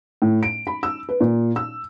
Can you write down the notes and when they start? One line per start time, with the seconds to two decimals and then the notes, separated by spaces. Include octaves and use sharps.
0.22 A2
0.43 D7
0.67 B5
0.83 E6
1.09 B4
1.20 A#2
1.56 E6